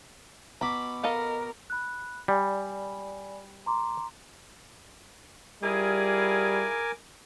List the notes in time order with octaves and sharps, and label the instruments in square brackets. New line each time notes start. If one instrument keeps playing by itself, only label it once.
[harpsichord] B2 B5 D6 [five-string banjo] A#5
[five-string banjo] A4 D#5 F5 [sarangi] A#4
[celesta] B5 F#6
[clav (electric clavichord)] G3 [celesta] D5 G#5 B5
[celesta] A#5 C6 D6
[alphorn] G3 [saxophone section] E4 F4 G#4 [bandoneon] A#4 G#5 D6